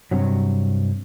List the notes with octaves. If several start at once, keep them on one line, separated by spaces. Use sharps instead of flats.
G2 C3 F#3